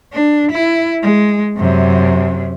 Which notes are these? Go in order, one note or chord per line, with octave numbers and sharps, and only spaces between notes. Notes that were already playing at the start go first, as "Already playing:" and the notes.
D4
E4
G#3
F#2 C3